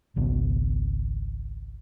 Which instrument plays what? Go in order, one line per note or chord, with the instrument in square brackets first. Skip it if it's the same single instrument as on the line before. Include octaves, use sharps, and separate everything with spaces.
[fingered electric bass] G#1 C#2 B2